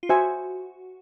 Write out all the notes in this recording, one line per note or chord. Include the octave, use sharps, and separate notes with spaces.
F4
F#4 C5 E5 G#5